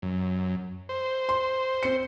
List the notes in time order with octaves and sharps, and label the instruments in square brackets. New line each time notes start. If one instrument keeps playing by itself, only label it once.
[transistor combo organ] F#2
C5
[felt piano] C6
C4 C#7